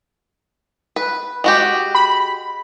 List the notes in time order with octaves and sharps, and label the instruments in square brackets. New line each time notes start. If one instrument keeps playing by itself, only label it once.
[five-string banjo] B4
G#3 F#4 G4
[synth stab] B5